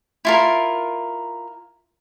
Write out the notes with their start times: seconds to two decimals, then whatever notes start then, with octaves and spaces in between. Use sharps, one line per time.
0.25 E4 F4 A#4